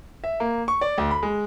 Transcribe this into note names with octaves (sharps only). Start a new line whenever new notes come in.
E5
A#3
C#6
D5
D2
B5
G#3